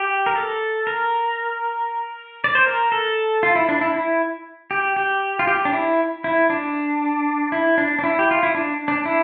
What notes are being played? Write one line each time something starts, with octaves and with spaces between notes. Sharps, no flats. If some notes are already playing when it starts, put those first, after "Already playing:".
Already playing: G4
A#4
A4
A#4
D5
C5
A#4
A4
F4
E4
D4
E4
E4
G4
G4
F4
G4
D4
E4
E4
D4
E4
D4
D4
E4
G4
F4
E4
D4
D4
E4